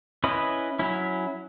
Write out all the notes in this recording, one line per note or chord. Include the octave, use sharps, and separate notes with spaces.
C#4 E4 B4 D#5
F#3 C#4 E4